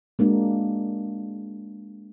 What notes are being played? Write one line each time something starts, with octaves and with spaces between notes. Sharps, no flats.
G#3 A#3 D4 F#4